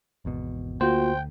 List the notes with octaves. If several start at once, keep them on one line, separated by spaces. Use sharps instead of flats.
G#1 E2 B2
D2 A#3 F4 F#4 C5 G5